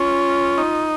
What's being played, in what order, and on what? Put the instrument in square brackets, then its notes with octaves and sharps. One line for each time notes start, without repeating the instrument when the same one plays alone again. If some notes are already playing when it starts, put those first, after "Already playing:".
Already playing: [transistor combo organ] C#4 [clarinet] F4
[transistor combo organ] D#4